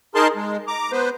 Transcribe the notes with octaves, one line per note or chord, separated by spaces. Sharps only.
D#4 G#4 A#4 A5 C6
G#3
A#5 D6
B3 B4 C5